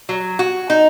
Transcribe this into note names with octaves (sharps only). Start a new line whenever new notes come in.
F#3
F#4
D#4